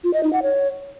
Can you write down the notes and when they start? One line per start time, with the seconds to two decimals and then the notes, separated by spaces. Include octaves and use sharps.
0.04 F4
0.14 D#5
0.23 D#4
0.33 F#5
0.43 C#5